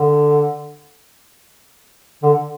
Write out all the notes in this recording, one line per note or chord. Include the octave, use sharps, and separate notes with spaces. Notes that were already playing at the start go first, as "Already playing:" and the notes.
Already playing: D3
D3